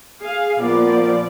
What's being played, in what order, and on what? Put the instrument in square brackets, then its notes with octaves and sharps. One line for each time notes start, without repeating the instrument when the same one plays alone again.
[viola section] G#4 F5
[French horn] A#2 [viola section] F3 B3 D5